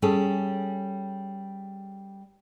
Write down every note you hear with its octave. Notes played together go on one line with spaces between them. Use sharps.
G3 C#4 G#4 A4